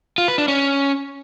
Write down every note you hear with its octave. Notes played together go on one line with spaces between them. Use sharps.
F4
B4
D4
C#4